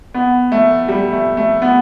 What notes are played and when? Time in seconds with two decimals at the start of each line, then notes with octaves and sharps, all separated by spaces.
0.14 B3
0.52 A3
0.88 G3
1.13 A3
1.37 A3
1.62 B3